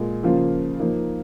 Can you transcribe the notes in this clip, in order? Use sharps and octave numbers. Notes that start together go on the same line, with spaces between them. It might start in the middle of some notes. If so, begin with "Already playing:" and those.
Already playing: A#2 G#3
C#3 F3 A#3 F4
F3 A#3 D#4